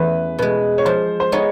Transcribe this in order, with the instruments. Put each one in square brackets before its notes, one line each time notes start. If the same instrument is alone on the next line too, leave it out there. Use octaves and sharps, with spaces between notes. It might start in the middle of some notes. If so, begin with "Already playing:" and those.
Already playing: [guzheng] E2 A3 C#4 [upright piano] B4
[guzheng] B2 G#3 [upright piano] B4
[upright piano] C#5
[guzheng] F3 [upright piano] C5
[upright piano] C5
[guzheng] G#3 B3 D#4 [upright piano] C#5